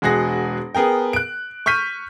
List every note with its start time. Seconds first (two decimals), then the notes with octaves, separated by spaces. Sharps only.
0.02 E1 G#3 F#4 G#4 A#6
0.75 B3 G#4 A#4 G5
1.13 F#6 D7
1.66 C#6 F6 G6 B6 D#7